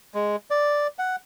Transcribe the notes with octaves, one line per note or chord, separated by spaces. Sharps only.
G#3
D5
F#5